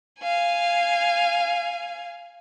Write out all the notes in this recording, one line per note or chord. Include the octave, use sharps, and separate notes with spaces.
F5 G#5